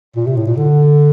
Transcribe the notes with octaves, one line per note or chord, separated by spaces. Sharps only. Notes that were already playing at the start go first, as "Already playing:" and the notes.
A#2
C3
A2
A#2
D3